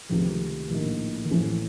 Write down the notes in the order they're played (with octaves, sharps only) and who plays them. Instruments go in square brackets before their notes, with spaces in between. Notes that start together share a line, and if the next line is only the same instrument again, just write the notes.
[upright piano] C#2 C3 D#3 A3 [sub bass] F3
[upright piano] A#1 A2 F3 A#3 D#4 [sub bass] D#3
[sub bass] D#3
[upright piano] A1 A2 A3 C#4 [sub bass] F3